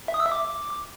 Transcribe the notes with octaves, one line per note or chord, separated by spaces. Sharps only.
E5
D#6
E6
E5
D6